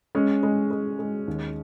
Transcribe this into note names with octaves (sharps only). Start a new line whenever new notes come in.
G#3 C#4
G#3
G#3
G#3
D#2